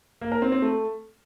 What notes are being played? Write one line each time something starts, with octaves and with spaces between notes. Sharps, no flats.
A#3
A#4
C4
C4
A3